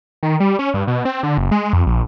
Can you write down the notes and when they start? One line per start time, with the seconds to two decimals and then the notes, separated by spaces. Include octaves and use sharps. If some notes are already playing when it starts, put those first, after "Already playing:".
0.23 D#3
0.40 G3
0.59 C#4
0.74 G2
0.87 B2
1.05 C4
1.23 D3
1.38 F#1
1.52 G#3
1.73 F2
1.86 A#1